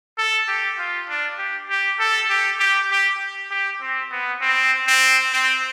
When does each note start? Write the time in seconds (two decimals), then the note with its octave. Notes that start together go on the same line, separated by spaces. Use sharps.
0.18 A4
0.48 G4
0.78 F4
1.09 D4
1.38 G4
1.69 G4
1.99 A4
2.30 G4
2.59 G4
2.91 G4
3.51 G4
3.81 C4
4.11 B3
4.41 C4
4.87 C4
5.32 C4